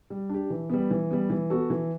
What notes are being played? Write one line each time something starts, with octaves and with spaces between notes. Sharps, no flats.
G3
D4 G4
E3
G3 B3
E3
G3 B3
E3
B3 F#4 A4
E3